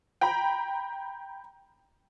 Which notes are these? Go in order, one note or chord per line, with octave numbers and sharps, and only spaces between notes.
G5 A#5 B5